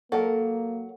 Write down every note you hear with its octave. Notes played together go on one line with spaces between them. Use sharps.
F#3 A#3 A4 A#4